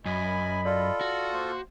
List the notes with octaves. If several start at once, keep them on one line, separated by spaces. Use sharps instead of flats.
F#2 D#5 G#5 B5
F4 A4 D5
F#4
A#3 C5